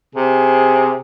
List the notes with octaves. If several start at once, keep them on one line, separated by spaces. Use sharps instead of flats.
C3 G#4